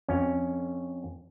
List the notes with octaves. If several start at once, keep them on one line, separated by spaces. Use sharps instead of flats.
F2 C#4